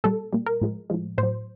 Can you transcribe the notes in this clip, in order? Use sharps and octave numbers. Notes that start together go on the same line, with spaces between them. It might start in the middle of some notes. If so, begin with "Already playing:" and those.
A#2 G3 A4
A#2 G3
A#4
A2 F3 G#3
A2 F3 G#3
A2 C5
F#3